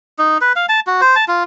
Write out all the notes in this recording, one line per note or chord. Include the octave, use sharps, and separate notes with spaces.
D#4
B4
F5
A5
F#4
C5
A5
F4